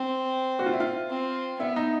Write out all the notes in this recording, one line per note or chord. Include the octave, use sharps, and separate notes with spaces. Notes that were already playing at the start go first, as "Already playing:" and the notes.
Already playing: C4
F#4
F4
E4
F4
C4
B3 E4
D#4